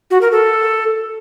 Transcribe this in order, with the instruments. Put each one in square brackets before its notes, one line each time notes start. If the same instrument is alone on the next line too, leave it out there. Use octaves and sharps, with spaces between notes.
[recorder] F#4
A#4
A4